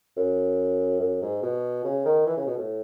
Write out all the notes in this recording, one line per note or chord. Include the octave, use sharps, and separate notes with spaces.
F#2
F#2
G#2
B2
C#3
D#3
E3
C#3
B2
A2